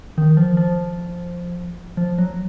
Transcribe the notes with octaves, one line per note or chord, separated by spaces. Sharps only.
D#3
F3
F3
F3
F#3